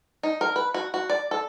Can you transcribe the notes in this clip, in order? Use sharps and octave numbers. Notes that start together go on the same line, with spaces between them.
D#4
A#4
B4
F#4
F#4
D5
A4